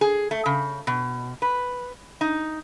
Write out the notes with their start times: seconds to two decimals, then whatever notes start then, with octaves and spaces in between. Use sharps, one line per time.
0.01 G#4
0.31 A3
0.46 C#3
0.87 B2
1.42 B4
2.21 D#4